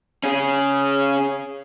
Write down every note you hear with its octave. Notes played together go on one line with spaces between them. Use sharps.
C#4 G#4